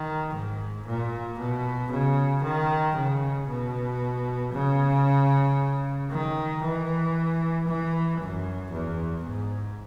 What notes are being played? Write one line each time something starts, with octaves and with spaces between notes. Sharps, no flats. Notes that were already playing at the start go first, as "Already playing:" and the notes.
Already playing: D#3
G#2
A#2
B2
C#3
D#3
C#3
B2
C#3
D#3
E3
E3
F#2
E2
G#2